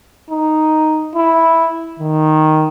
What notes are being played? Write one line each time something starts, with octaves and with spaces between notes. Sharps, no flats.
D#4
E4
D#3